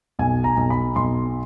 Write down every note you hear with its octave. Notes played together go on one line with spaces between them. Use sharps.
B1 G#5
A#5
B1
B5
B1 C6